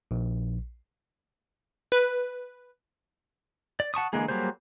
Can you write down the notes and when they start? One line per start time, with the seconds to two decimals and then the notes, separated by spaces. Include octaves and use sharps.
0.11 A#1
1.92 B4
3.80 D5
3.94 F#5 A5 C#6 D#6
4.13 D3 E3 G#3 A#3 G#4
4.28 F#3 G3 A#3 G#4 C5